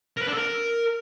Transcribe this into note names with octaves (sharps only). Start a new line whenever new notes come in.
A#4
B4
D4
A4
A#4